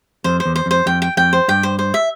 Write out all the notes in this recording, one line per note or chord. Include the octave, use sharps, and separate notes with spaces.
F2 C5
C5
E2
C5
F2 C5
F2 G5
G5
F2 G5
C5
G2 G5
C5
C5
E5